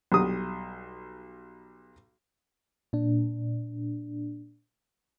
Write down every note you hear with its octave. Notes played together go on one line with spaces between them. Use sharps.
B1 G3 D#6
A#2 D4